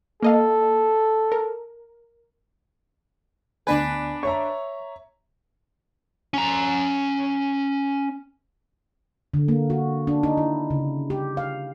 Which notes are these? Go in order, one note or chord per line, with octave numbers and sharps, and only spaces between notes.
A#3 A4 D#5 F5
A#4
D2 B3 D4 B4 G#5
C#5 E5 A#5 C#6
C#4 A#5
D3
A#3
F#4
D4
D#4
E4
C#3
G4
F5